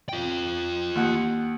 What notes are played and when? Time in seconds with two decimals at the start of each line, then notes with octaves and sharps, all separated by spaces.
0.09 F4 G5
0.96 D#2 F#5